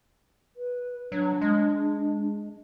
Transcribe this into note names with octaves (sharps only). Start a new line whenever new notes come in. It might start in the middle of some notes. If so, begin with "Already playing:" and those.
B4
F#3 D4
G#3